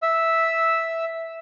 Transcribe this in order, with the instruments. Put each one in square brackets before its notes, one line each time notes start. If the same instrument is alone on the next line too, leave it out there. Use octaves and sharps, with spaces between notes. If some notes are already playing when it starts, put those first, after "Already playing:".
[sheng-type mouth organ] E5 E6